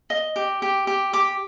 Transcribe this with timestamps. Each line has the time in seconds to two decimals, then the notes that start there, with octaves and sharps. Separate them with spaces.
0.10 D#5
0.36 G4
0.62 G4
0.87 G4
1.13 G4 D6